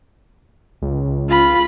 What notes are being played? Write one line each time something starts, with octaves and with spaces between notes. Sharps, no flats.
C#2
F4 B5